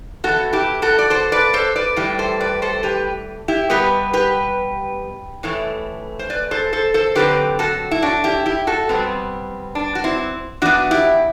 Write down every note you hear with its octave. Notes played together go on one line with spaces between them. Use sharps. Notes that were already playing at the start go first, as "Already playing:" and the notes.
E3 B3 F#4 A4
E4 G4
F#4 A4
D5
A4 C5
B4 D5
A4 C5
B4 D5
A2 E3 G3
A4 C5
B4 D5
A4 C5
G4 B4
E4 G4
B2 G3 B3 G4 B4
G4 B4
A2 E3 A3
C5
B4 D5
A4 C5
A4 C5
A4 C5
D3 F#3 C4 G4 B4
F#4 A4
E4
D4 F#4
E4 G4
E4 G4
F#4 A4
B2 G3 B3 C4
D4
F#4
C4 E4
E3 B3 D4 F#4
E4 G4